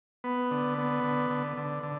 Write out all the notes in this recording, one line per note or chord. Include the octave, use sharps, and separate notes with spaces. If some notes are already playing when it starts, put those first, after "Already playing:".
B3
D3
B3
D3
D3
D3
D3